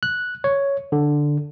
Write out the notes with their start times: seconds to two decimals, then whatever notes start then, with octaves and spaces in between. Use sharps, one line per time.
0.03 F#6
0.44 C#5
0.92 D3